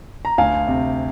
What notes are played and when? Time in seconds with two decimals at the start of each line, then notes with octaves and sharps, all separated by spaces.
0.25 A#5
0.38 D2 F5 G#5
0.67 C3